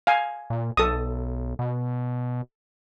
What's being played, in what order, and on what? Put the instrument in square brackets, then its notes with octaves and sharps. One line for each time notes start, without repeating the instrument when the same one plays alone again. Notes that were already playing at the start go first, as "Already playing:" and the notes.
[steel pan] F5 G#5
[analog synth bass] A#2
[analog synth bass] B1 [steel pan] A4 D#6
[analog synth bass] B2